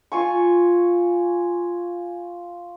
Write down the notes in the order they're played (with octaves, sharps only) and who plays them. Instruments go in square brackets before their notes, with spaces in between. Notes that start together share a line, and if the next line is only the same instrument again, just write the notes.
[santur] F4 G#5 C#6